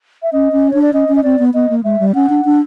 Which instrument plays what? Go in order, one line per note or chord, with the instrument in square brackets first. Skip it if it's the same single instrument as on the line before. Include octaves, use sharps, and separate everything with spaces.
[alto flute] E5
[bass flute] C#4 [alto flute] D#5
[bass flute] C#4
[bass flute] D4 [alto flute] C#5
[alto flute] D5
[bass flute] C#4 [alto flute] D#5
[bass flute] C#4
[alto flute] D#5
[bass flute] C4 [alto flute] D5
[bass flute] B3
[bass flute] B3 [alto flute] D#5
[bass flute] A#3
[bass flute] G#3 [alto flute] E5
[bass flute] G3
[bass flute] C#4 [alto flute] F#5
[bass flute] D4
D4